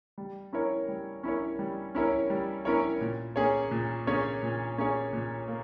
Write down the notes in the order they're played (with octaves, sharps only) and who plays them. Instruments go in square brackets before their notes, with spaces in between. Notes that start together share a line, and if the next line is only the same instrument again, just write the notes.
[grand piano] G3
C#4 E4 A#4 C#5
G3
C#4 E4 A#4 C#5
G3
C#4 E4 A#4 C#5
G3
C#4 E4 A#4 C#5
A#2
A#3 C#4 G#4 C#5
A#2
A#3 C#4 G#4 C#5
A#2
A#3 C#4 G#4 C#5
A#2
A#3